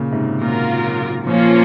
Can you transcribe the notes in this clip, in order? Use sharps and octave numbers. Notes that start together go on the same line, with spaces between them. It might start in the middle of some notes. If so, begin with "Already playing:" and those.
Already playing: A#2 C#3
G#2 C3
A#2 F#3 A#3 F4 A#4
A#2 F3 A#3 C#4 F4